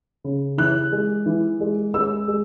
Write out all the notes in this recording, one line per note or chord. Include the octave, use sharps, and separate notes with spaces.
C#3
E3 F#6
G#3
E3
G#3
G#3 E6
G#3